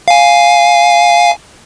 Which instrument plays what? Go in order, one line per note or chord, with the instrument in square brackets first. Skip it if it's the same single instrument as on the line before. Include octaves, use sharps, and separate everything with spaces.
[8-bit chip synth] F5 G#5